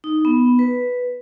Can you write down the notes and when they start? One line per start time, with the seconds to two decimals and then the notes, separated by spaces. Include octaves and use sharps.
0.04 D#4
0.25 B3
0.59 B4